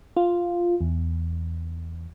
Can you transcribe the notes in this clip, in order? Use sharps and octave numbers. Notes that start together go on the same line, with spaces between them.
F4
E2